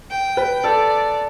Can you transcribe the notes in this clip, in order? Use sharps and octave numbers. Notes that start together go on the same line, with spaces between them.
G5
B4
A4 D5